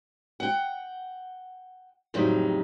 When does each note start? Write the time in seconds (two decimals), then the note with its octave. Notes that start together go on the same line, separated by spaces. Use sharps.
0.40 F#5 G5
2.14 F2 A2 C#3 F#3 G3 D#4